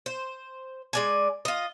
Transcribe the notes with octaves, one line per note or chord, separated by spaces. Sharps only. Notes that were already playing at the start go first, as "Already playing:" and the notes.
C5
G#3 D5 G#5
F4 D#5